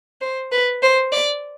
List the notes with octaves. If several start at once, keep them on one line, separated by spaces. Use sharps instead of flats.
C5
B4
C5
D5